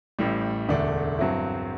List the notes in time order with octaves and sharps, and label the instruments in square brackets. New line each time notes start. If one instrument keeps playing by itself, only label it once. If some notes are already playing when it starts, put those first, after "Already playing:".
[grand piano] A1 A2 G3
E1 D2 D3 A3 D4
G2 F#3 C4 E4